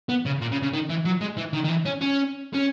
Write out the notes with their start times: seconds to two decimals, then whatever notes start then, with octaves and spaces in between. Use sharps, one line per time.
0.09 B3
0.26 C#3
0.41 A#2
0.52 C#3
0.63 C#3
0.73 D#3
0.90 E3
1.06 F#3
1.22 G#3
1.38 E3
1.54 D#3
1.65 D#3
1.69 E3
1.86 C#4
2.01 C#4
2.54 C#4